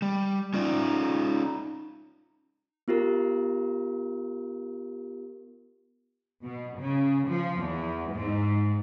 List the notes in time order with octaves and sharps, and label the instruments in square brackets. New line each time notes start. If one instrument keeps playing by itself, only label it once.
[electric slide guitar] G3
[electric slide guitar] C#4 F4 D5 [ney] D#4
[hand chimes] B3 F4 G4 A#4
[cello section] B2
C#3
F3
E2
G#2